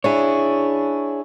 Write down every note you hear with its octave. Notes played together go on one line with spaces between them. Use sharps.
D4 E4 G#4 C#5